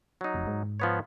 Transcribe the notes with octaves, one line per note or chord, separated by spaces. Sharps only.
F#3 D#4
F1
G#2
F3 B3 C#5